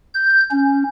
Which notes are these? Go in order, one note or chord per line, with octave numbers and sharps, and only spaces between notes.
G6
C#4